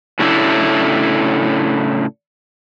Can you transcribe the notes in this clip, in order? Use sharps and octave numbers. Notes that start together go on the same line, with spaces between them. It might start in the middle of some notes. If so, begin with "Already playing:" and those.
A2 C#3 F#3 A3 D4 E4